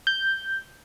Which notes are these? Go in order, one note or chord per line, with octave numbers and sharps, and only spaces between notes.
G6